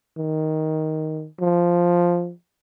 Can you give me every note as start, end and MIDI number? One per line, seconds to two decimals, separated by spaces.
0.18 1.27 51
1.40 2.32 53